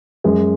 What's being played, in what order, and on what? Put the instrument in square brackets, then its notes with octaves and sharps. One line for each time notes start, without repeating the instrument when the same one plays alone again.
[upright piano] F#2 G#3